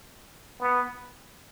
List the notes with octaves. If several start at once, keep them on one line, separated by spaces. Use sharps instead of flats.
B3